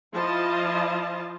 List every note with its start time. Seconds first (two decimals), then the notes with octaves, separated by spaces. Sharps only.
0.16 F3 E4 D#5 F5 A5